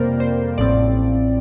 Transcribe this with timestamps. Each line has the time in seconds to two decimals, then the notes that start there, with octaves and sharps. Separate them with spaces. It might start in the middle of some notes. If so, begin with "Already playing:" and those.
Already playing: F2 C3 G3 A#3 A#4 C5 D5
0.20 C5
0.58 A1 A2 F3 C4 D5